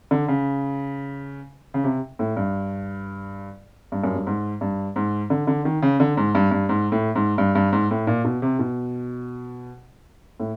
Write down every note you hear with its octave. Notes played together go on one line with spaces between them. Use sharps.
D3
C#3
C#3
C3
A2
G2
G2
F#2
G2
G#2
G2
G#2
D3
D3
D#3
C#3
D3
G#2
G2
G2
G#2
A2
G#2
G2
G2
G#2
A2
A#2
B2
C3
B2
A2